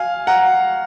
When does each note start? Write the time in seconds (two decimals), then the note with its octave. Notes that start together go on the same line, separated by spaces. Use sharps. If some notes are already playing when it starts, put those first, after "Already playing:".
Already playing: F5 G#5
0.27 F#5 A#5